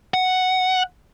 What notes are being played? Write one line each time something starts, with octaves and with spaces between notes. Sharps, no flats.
F#5